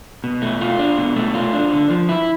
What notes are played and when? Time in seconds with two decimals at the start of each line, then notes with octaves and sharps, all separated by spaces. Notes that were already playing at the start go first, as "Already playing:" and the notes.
0.24 B2
0.42 A3
0.61 F4
0.79 D4
0.98 B2
1.16 A3
1.34 F4
1.53 D4
1.72 D3
1.90 F3
2.09 E4